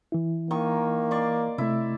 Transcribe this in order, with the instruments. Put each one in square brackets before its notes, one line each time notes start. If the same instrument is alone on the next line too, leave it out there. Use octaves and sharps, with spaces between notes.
[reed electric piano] E3 E4
[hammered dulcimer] D#3 C#6 [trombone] A#3
[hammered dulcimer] D5 C6 C#6
[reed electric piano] C3 A3 [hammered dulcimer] E4